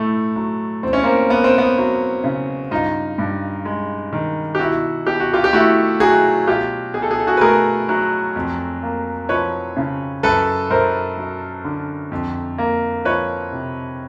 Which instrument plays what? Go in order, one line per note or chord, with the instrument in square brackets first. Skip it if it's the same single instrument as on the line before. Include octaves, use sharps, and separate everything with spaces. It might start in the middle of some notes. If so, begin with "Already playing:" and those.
Already playing: [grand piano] A2 A3
F#3
E2 C4
C#4
A#3 C4
A#3 B3
C4
B3
F#3
C#3
G2 D#4 F4
G2
G#3
D#3
G4
B2 E4 F#4
B2 G4
F#4
F4 G4
G4
A3 E4 F#4
F#3 F#4 G#4
B2 F4 G4
B2 G#4
A4
G#4
A4
F#4 G#4
B4
A3 G#4 A#4
F#3
F2
A#3
F3 B4 C#5
C#3
F#2 A4 B4
F#2 A#4 C5
F#3
D3
F2
A#3
F3 B4 C#5
C3